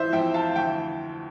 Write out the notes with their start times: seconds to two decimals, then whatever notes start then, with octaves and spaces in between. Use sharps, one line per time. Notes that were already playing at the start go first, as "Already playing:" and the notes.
Already playing: E3 F3 C5 E5
0.13 F2 E5 G5
0.34 F5 A5
0.56 D2 E5 G5